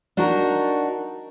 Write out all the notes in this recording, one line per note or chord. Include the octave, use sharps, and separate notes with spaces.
D4 D#4 F#4 A#4